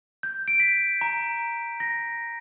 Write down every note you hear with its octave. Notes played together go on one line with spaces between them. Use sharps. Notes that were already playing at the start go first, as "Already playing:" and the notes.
G6
D7
B6
A#5
A#6